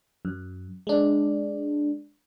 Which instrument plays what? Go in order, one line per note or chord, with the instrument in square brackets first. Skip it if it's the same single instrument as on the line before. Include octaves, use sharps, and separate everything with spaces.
[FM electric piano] F#2
G#3 D4